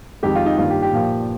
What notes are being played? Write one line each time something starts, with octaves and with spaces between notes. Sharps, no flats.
F2 D#3 G#3 G4
F4
D#4
G2 D#3 A#3 F4
G4
G4
A#2 F3 A#3